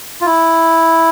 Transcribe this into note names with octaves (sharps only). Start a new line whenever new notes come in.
F4
E4